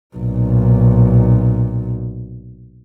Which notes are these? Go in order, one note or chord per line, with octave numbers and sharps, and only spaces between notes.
B1 A#2